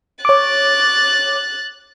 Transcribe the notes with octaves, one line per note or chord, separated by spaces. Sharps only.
C#5 D6 F#6 A6